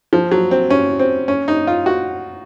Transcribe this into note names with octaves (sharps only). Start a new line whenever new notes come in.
F3
F#3
C4
C#4
C4
C#4
D#4
F4
F#4